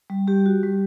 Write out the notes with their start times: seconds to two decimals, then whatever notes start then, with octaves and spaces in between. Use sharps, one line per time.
0.10 G3
0.28 G3 G4
0.46 F#4
0.63 G3